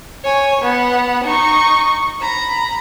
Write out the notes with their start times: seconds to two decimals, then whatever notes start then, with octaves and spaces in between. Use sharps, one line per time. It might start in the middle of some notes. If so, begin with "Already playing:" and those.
0.24 C#5 G#5
0.61 B3 F#5
1.24 D#4 C#6
2.21 A#5 B5